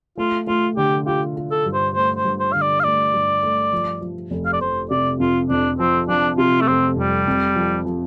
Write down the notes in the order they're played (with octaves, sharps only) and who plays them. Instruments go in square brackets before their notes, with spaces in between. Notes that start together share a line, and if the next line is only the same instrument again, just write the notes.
[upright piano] A3 [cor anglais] F4
[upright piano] A3 [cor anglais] F4
[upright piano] D3 [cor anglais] G4
[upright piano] F4 [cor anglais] G4
[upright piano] F4
[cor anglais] A4
[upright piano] G2
[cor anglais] C5
[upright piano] A3 [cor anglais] C5
[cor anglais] C5
[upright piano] G2
[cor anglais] C5
[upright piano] D3 [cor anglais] F5
[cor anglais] D5
F5
[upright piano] A3 [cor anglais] D5
[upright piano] G2
A3
F3
F3
F1
[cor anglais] F5
D5
[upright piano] F1 [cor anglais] C5
[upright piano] C3 [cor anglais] D5
[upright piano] F2 [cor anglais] F4
[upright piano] F2 [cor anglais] D4
[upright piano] F3 [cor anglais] C4
[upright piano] F3 [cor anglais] D4
[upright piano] C3 [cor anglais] F4
[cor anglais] A3
[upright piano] F1 [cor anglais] C4
[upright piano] F2 [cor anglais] G3
[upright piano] F2
F3
F3